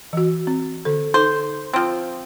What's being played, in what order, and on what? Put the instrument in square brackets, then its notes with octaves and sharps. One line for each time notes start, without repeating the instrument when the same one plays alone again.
[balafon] E3 F#4
C4
D3 A4
[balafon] D#4 A4 [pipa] C5
[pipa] F3 C4